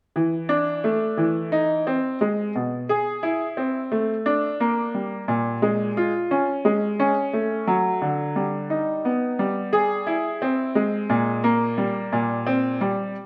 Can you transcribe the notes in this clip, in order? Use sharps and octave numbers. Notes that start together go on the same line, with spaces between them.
E3
D4
A3
E3
D#4
C4
G#3
B2
G#4
E4
C4
A3
D4
A#3
G3
A#2
G#3
F4
C#4
G#3
C#4
A3
F#3
D3
G3
D#4
B3
G3
G#4
E4
C4
G#3
A#2
A#3
G3
A#2
C4
G3